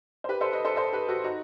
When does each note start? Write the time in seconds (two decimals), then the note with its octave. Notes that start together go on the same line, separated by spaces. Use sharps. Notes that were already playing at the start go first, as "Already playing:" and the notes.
0.24 C5
0.29 G4 B4
0.41 A4 C5
0.52 B4 D#5
0.65 A4 C5
0.76 A4 C5
0.93 G4 B4
1.08 F#4 A4
1.24 D#4 F#4